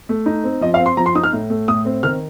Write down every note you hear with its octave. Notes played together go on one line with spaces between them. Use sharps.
A3
D#4
C4
F3 D#5
F5
C4
C6
F3 A#5
C6
D#4 D#6
F6
A2
A3
A2 D#6
C4
D#3 F6